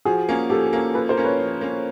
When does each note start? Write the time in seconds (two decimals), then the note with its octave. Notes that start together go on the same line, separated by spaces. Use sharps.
0.05 F3 F#4 G#4
0.29 A#3 C#4
0.50 F3 G4 A4
0.73 A#3 C#4
0.94 F3 A4 B4
1.09 A#4 C5
1.17 A#3 C#4
1.24 B4 C#5
1.40 F3
1.61 A#3 C#4